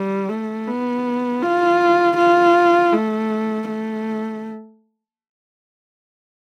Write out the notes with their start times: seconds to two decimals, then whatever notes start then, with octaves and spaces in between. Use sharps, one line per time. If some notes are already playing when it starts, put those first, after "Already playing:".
Already playing: G3
0.29 A3
0.67 B3
1.42 F4
2.18 F4
2.93 A3
3.69 A3